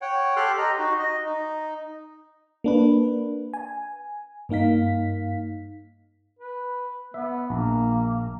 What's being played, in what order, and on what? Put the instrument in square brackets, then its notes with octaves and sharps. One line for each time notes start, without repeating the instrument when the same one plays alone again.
[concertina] C#5 F#5 G5
G4 A4 C6 F6 F#6
G4 D#5 A#5
D#4 F#4
D#5
D#4
[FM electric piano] A#3 D4 B4
G#5
G2 A#3 D#4 F5 B6
[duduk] B4
[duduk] B3 [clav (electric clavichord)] E5
[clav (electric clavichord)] A#1 [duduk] A#3